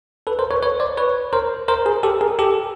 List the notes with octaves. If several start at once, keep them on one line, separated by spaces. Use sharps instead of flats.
A4 B4
A#4 C5
B4 C#5
B4 C#5
C5 D5
B4 C#5
A#4 C5
A#4 C5
G#4 A#4
G4 A4
G#4 A#4
G4 A4